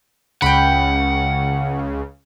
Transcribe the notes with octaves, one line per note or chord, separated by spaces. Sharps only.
C#2 C#3 F#5 G5 B5